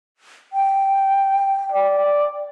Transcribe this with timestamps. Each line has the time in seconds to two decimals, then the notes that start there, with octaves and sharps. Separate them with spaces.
0.53 G5
1.72 D5